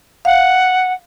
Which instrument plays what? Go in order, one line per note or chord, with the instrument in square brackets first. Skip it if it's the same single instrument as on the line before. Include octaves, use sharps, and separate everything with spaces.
[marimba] F5 [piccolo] F#5